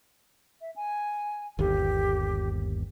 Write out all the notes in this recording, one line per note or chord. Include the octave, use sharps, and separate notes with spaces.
E5
G#5
G1 D#2 G4